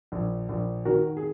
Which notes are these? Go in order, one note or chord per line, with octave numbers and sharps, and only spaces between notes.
A#1
A#1
D#3 F#4 A#4
G#4